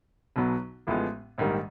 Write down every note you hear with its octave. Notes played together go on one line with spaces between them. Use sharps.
B1 B2 F#3 B3
A1 A2 F3 G#3 B3
A#1 G#2 D#3 G3